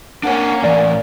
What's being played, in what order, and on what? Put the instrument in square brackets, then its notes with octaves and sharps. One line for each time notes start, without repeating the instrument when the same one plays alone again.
[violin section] A#3 C#4 [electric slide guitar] D4 C#5 [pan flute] F#5
[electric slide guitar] A2 E3 [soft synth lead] D5